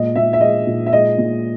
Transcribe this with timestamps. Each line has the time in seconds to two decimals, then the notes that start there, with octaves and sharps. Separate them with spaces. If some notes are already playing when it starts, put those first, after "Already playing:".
Already playing: A#2 G#3 D#5
0.15 A#2 E5
0.33 E5
0.41 G#3 D#5
0.67 A#2
0.86 E5
0.93 G#3 D#5
1.18 A#2